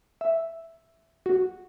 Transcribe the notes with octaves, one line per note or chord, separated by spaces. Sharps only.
E5
F#4